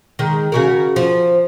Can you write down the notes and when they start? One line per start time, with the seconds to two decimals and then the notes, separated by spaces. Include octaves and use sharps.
0.19 D#3 G#3
0.52 C#3 F#4 A#4
0.96 F3